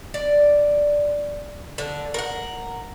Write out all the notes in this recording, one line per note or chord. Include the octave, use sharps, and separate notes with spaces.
D5
D3
A#4 F#5